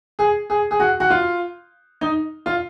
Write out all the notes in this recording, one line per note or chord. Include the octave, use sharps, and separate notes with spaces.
G#4
G#4
G#4
F#4
F#4
F4
D#4
F4